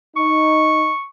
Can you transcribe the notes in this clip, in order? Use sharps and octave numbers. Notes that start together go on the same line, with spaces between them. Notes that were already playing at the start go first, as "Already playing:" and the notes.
D#4 C#6